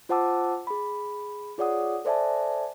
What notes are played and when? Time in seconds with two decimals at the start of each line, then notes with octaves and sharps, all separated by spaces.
0.09 F4 C5 F#5 A5 D6 E6
0.67 G#4 B5
1.58 F4 G#4 C#5 D5 F#5 D#6
2.05 A4 C5 D5 E5 G#5 A5